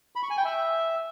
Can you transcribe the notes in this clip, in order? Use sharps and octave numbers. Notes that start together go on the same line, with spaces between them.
B5
C#6
G#5
G5
E5